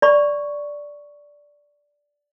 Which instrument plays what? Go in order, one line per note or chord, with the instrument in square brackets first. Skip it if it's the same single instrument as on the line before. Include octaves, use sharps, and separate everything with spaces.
[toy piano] D5 B5 C#6